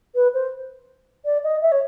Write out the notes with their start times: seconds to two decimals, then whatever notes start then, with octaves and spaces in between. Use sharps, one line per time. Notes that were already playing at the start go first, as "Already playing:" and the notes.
0.15 B4
0.33 C5
1.25 D5
1.43 D#5
1.61 E5
1.71 C#5